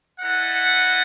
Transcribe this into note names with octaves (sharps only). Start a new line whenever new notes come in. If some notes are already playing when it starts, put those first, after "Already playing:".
E4 A4 D#5 F#5